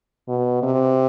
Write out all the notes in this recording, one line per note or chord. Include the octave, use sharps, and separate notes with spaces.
B2
C3